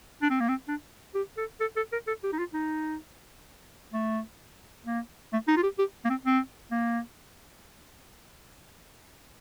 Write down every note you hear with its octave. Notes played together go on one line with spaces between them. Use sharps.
D4
C4
A#3
C4
D4
G4
A4
A4
A4
A#4
A4
G4
D#4
F4
D#4
A3
A#3
A3
D#4
F4
G4
G4
A#3
C4
C4
A#3